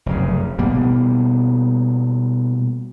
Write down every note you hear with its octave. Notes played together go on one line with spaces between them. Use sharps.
F1 F#2 C#3
B2 G3 A#3